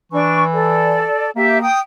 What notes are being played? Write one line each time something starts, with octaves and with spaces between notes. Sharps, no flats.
E3 D4 C#6
A4 D5
A#3 G4 E5
G5 D#6